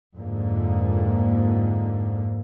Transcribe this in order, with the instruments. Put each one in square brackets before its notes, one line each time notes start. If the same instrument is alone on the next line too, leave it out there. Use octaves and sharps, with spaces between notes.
[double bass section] F2 G#2 D3 A#3